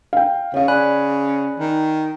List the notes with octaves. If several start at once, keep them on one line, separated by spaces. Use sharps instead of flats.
F5 G5
C#3 C#5 F5
D5 G#5 B5 F#6
D#3